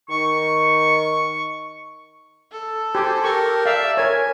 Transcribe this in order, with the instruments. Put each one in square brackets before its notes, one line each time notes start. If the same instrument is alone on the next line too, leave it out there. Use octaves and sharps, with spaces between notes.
[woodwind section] D#3 C#6
[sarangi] A4
[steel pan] G4 [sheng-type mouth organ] C5 G#5
[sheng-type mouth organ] G4 A#4 [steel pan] C#6
[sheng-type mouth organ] D5 E5 [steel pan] F5
[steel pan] A#4 C#5 [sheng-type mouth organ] G#5